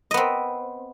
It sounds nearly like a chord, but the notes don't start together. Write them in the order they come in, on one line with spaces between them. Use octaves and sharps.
D#5 B3 C4